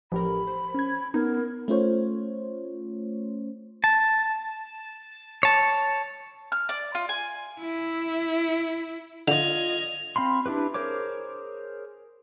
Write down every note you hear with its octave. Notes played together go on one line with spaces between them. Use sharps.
A1 F3 G4 A#4 B5
C5
C#4 G#6
B3 D#4 A#4
A3 C#4 F4 C5 C#5
A5
C#5 A5
F6
D5
F4
G#5
E4
D3 F4 D#5 G#6 F7
C4 F5 B5 C6
D4 E4 G4 B4
G#4 A#4 C5 C#5 D6